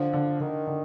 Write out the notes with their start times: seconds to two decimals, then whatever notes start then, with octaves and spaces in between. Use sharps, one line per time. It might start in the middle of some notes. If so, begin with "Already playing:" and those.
Already playing: D3 F3
0.13 D3
0.40 D3 D#3
0.67 D3